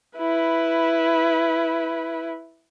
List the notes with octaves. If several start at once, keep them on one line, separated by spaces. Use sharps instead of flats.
E4 B4